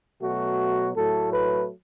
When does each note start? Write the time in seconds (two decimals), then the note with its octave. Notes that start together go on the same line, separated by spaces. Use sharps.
0.21 B2 F#3 A3 F#4
0.96 A2 F#3 A3 A4
1.33 B4